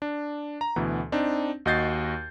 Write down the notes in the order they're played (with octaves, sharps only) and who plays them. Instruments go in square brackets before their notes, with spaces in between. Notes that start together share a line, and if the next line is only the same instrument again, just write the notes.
[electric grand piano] D4
A#5
D2 B2 E3
C4 D4 D#4
D#2 F#4 D#5 G6 A6 C7